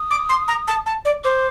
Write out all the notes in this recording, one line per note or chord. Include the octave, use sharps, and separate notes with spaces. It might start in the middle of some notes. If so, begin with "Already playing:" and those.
Already playing: D#6
D6
C6
A#5
A5
A5
D5
C5 D6